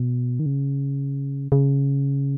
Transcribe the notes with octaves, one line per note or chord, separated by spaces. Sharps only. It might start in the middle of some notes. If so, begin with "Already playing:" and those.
Already playing: B2
D#3
C#3
C#3